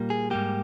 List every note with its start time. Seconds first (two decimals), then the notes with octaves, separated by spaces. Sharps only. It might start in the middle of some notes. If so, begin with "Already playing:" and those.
Already playing: A#2 G3 A#3
0.10 G#4
0.30 G#2 G3 A#3 G4